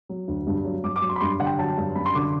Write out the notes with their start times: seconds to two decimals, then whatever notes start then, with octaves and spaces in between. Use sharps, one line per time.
0.09 F#3
0.28 D2
0.47 G2
0.64 F#3
0.83 G2 D6
0.96 D6
1.02 F#3
1.09 C6
1.16 B5
1.21 G2 C6
1.39 D3 F#5
1.46 G5
1.59 F#3 A5
1.78 G2
1.95 F#2 B5
2.06 C6
2.14 D3 D6